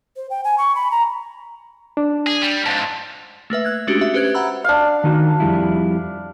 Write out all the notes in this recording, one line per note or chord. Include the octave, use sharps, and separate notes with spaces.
C5
G5
G#5
C#6
B5
A#5
D4
G#4
G3
F2 G#2 A5 A6
A3 A#3 B4 E5
F#6 G#6
G#3 A3 C#4 D4 F#4 G4
F#4 E5
C#4 G4 B4 C5 F#6 G#6
E5 F#5 A#5 B5 E6
D4 F5
D#3 D#4 F#4
F2 G3 E4